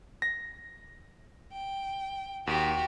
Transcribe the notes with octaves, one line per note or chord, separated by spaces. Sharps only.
A#6
G5
D#2 F#4 G4